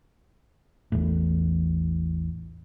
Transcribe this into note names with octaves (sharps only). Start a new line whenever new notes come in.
A1 E2 A2